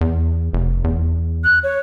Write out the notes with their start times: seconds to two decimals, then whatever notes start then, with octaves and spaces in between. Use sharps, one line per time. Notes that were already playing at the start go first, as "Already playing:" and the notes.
0.01 E2
0.53 F1
0.84 E2
1.44 F#6
1.63 C#5